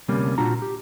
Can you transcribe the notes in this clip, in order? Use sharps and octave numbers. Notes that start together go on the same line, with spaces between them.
D2 C3 G3 A#3 C#4
A#2 D4 F4 F#4 A#5
G4